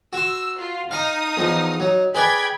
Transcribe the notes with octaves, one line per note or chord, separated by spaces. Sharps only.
F#4 C6 E6
F4
D#4 F5 A#5 D#6
E2 F3
F#3
G#4 B4 D5 G5 B5 G#6